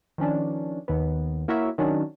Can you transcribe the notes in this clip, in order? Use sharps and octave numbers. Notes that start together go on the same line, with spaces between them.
D#3 F3 C#4 D4
D#2 B3
A#3 E4 F#4 A#4 C#5 E5
D#3 F#3 C#4 D4